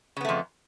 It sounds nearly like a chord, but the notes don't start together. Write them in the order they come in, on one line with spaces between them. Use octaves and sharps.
C#3 B3 A3 F2